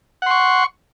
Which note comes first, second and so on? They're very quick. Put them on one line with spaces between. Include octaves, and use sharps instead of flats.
F#5 C6 C#6